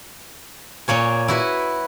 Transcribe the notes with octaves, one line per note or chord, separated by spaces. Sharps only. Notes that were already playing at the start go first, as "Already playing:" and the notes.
A#2 A#3 C#5 G#5
E4 F#4 B4